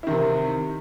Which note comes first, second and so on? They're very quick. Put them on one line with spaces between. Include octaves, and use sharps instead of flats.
E4 D#3 C3